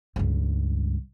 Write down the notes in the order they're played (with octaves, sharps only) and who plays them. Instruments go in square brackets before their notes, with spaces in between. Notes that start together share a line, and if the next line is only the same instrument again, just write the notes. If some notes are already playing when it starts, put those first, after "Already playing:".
[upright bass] C#2 G2